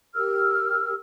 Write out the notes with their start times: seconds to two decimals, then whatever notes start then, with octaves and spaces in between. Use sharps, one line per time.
0.15 G4 A#4 E6 F6